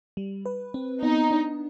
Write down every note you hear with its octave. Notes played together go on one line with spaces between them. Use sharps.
G3
B4
C4
B3 D#4
D4